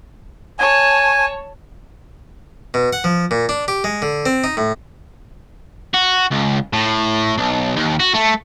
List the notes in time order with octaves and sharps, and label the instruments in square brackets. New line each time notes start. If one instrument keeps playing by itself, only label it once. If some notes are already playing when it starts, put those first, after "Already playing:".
[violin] C#5 A5 [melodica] G#5
[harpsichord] B2
F#5
F3
A#2
D4
G4
G#3
D3
C4
D#4
A2
[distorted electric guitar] F#4
C#2
A2
B1
D#2
F#4
A3